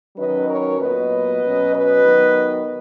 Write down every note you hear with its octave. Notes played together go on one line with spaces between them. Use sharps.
D#3 F#3 C#4 B4 D#5
A#4 C#5
A#2 F#3 B3 B4 D#5
B2 F#3 C#4
B4 D#5
D#3 F#3 B3